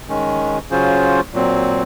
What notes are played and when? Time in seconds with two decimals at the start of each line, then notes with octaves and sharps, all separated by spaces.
0.08 D#3 G#3 C#4
0.70 C#3 F#3 C#4 F4 C5
1.33 A#2 F#3 C4